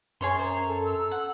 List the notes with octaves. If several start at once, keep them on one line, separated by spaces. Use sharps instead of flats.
F#2 G#4 C#5 C6
C5 A#5
A4
E6
F#5